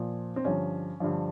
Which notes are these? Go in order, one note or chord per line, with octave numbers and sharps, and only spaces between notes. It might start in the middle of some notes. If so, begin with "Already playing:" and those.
Already playing: A#2 F3
C4
G2 D3 F3 C#4
G2 D3 F3